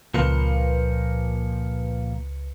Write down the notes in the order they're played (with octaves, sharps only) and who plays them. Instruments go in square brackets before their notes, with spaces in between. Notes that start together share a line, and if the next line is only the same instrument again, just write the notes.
[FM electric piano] C#2 B4 C#7 [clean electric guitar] A#2 F3 A#3